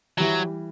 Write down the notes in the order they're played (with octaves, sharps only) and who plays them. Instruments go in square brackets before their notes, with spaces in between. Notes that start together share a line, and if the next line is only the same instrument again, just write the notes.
[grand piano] E3 G3 [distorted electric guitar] F#3